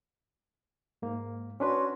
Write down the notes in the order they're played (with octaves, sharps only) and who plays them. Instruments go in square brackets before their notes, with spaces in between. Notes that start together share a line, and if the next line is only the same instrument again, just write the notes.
[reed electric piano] G#2 A#3
[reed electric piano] C#4 D4 B4 [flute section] F#4 C#5 C6